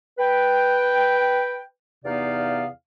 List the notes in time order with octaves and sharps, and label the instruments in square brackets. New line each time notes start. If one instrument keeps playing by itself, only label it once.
[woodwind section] B4 G5
E2 C3 B3 D#4 D5 F5